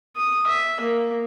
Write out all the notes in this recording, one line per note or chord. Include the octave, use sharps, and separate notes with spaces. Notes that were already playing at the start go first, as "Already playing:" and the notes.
D#6
E5
A#3